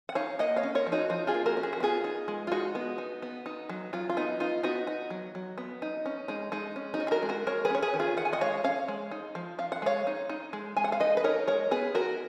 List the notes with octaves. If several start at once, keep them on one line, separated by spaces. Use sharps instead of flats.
F#5
D#4 C#5 F5
A#3 D#5 F#5
C#5 F5
C#4
A#4 C#5
F3
D#4 F#4
F3 D#4
F4 G#4
A#3
F#4 A#4
C#4
G#4
F#4
B3 F4 G#4
D#4
G#3
F4
G#3 D#4 F#4
B3
D#4
B3
D#4
F#3
F#3 F4
F4
B3 D#4
D#4 F4
B3 D#4 F#4
D#4
F#3
F#3
B3
D#4
C#4
G#3 D#4
G#3 D#4
C#4
D#4 F#4
C#4
G#4
F#4 A#4
G#3
F#4 A#4
G#3 A#4 C#5
G#4 B4
C#4 C#5
G#4 B4
D#3
F4 G#4
D#3 F#5
G#5
D#5 F#5
G#3 C#5 F5
C#4 C#5 F5
G#3
D#4
F3
F3 F5
F#5
G#3 C#5 F5
D#4
D#4
G#3
G#3 G#5
F#5
F5
D#4 B4 D#5
B4
D#4 A#4 C#5
G#3 A#4 C#5
B3 G#4 B4
D#4 F#4 A#4